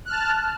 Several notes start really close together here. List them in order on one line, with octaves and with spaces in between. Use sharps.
F#6 F6 A5